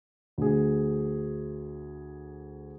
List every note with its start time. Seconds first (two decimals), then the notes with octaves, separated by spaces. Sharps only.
0.38 D2 G#4